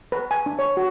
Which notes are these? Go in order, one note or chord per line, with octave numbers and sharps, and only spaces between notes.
B4
G#5
D4
C#5
F#4